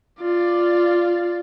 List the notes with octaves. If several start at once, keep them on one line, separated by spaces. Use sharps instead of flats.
F4 D5